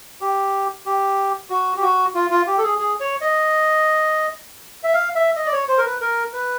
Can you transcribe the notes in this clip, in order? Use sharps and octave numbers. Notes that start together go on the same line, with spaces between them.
G4
G4
F#4
G4
F#4
F4
F4
G4
A4
G#4
G#4
C#5
D#5
E5
F5
E5
D#5
D5
C#5
C5
A#4
B4
A#4
B4